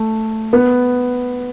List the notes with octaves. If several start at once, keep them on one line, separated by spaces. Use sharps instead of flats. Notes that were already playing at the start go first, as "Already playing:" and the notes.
Already playing: A3
B3